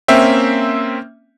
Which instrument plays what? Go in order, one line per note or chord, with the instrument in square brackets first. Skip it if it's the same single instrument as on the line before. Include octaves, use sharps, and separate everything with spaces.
[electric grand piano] A#3 C4 C#4 E5 G5